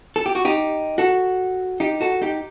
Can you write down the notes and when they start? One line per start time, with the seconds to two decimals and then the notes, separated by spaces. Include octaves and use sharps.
0.16 A4
0.26 G4
0.35 F#4
0.45 D#4 G4
0.98 F#4 A4
1.80 D#4 G4
2.01 F#4 A4
2.22 D#4 G4